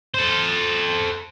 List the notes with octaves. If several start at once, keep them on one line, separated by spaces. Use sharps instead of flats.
A4 C5